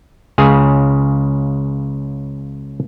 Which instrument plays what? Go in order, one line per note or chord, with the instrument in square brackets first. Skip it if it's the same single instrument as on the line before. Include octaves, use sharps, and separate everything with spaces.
[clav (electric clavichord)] C#2 C#3 G#4